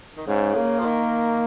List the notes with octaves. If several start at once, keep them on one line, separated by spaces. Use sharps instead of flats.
D#3
G#2 C#3
A#3
F3
D#3